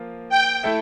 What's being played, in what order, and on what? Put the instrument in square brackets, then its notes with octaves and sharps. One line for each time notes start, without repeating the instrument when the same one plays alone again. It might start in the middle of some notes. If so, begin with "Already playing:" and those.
Already playing: [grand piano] F3 A#3 F4
[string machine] G5
[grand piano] A3 E4 A4 E5